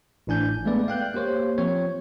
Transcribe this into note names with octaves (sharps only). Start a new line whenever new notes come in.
A1 A2 D4 G#5 G6
G#3 A3 B3 B4 D5
F5 G5 F#6 G6
A#3 G4 C5 C#5
F3 C4 C#5